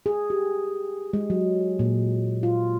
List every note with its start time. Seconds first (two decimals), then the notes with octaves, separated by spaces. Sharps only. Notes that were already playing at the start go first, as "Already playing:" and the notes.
0.06 G#4
0.30 G4
1.13 G#3
1.30 F#3
1.79 A#2
2.43 F4